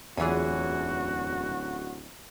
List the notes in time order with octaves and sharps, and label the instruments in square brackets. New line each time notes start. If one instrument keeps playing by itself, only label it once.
[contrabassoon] D1 [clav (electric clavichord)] E2 E3 [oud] C#4 F4 G#4 [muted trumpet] F#4